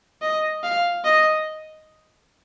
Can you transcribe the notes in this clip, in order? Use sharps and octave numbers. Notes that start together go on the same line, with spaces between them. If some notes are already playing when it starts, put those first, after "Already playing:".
D#5
F5
D#5